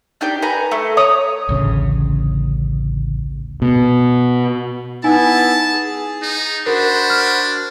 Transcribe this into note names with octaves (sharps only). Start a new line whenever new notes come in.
D4 D#4 G4 G5
B4 G#5 A#5
A3
C#5 A#5 D#6
A1 D2 C#3
B2
B3 D#4 E4 E5 G#5 A5
G#4
D#4
D4 F#4 A#4 C5 B5
F6